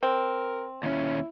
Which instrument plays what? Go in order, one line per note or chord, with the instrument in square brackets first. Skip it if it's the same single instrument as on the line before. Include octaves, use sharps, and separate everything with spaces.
[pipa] C4 [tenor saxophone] A#4
[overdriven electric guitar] D#2 C#4 [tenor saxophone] E4